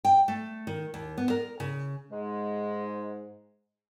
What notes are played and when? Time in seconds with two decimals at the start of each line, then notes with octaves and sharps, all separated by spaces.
0.05 G5
0.28 A3
0.67 D#3
0.94 D#2
1.18 B3
1.30 A#4
1.60 C#3
2.11 G#2 G#3